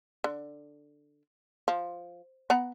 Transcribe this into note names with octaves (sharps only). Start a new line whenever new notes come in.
D3
F3
B3 F#5 A#5